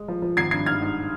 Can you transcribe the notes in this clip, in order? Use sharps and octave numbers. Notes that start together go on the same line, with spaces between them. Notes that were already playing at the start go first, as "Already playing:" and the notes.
Already playing: G#3
F3
F3
G#1 G#6 C7
G2 G#6 C7
G#2 F6 G#6
G#2